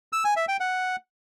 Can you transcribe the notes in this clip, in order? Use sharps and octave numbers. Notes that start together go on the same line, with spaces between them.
E6
G#5
E5
G5
F#5